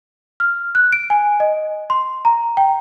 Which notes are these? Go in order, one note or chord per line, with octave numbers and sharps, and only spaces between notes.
F6
F#6
D7
G#5
D#5
C6
A#5
G5